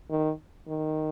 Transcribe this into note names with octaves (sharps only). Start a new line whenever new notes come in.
D#3
D#3